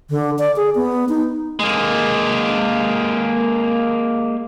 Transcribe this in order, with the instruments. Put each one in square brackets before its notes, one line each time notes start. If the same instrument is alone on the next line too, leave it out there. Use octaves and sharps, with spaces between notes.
[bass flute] D3
D5
G#4
B3
D#4
[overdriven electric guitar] G#3 A#3